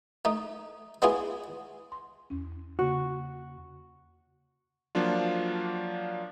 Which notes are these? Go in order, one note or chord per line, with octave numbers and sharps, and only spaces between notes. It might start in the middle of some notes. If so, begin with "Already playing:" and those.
A3 D#4
G#3 B3 C#4 E4 F4 G#4
C6
E2 C#4
C#3 A#3 F#4
F3 F#3 A#3 D4 F4